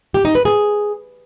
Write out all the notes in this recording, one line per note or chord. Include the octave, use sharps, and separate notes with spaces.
G4
D#4
B4
G#4